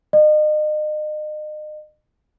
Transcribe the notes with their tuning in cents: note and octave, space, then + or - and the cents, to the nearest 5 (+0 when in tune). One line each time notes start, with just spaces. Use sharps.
D#5 -35